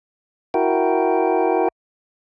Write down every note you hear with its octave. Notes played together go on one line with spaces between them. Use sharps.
E4 F#4 A#4 G5